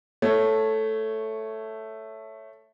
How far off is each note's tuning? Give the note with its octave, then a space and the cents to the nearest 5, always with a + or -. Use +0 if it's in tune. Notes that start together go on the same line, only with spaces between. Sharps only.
A3 +0 C#5 +0